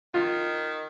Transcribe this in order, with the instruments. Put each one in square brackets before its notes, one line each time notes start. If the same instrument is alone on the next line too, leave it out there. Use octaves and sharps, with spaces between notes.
[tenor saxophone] D#3 [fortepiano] F4